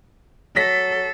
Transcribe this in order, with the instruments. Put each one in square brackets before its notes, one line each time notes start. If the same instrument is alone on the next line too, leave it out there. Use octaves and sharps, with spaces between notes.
[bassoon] F#3 [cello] A4 [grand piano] A#6 B6